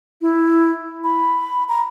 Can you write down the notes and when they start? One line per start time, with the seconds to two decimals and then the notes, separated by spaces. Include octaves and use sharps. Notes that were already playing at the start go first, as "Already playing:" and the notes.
0.21 E4
1.04 B5
1.69 A#5